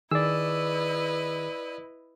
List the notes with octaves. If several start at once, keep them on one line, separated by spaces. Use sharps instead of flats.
D#3 E4 G#4 B4 D5 D#5 E6